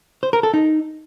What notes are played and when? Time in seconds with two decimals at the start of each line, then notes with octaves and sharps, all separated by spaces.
0.23 C5
0.33 A#4
0.43 A4
0.54 D#4